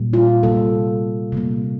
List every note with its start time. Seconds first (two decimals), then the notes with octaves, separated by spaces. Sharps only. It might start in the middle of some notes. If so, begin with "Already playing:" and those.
Already playing: A#2 G3 A#3
0.13 F4
0.43 C3 G3 A#3 A4
1.32 C3 G3 A#3